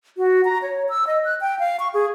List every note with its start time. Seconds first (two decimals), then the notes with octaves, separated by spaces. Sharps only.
0.18 F#4
0.45 A#5
0.62 C#5
0.89 E6
1.07 D#5
1.25 F#6
1.41 G5
1.59 F5
1.80 C#6
1.94 G#4